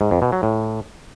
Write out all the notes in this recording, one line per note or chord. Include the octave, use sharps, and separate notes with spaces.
G#2
F2
B2
F#3
A2